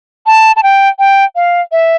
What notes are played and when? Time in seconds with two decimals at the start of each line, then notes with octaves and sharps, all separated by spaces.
0.26 A5
0.56 A5
0.63 G5
0.99 G5
1.36 F5
1.72 E5